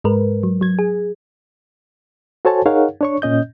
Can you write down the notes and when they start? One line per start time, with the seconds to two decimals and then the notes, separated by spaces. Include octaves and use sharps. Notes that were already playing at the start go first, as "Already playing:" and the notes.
0.04 G#2 G#3 A#4 B4
0.43 F#3
0.61 F#3 G#6
0.79 G#4
2.45 F#4 A4 C5 C#5 G#5 A5
2.66 D#4 G#4 A#4 C#5 F5 F#5
3.01 D4 C#5 C#6
3.22 A#2 C#4 D#5 G6